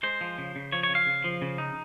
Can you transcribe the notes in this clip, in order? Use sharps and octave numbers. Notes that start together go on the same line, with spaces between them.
G#3 C5
F3
C#3
C#3
F3 C#5
C#5
C#3
F5
C#3
F3
C#3
D#4